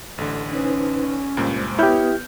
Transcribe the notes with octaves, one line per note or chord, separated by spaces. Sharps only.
A1 D3 A4
C#4 D#4 B4 C5
C#2 G2 A#2 G#3 C5
B3 E4 G4 B4 C#5 D#6 F6 G6